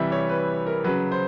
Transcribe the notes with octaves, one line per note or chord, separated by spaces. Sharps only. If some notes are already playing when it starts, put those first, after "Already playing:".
Already playing: C3 E3 G3 E5
C#5
B4
A#4
C#3 F#3 B4
C5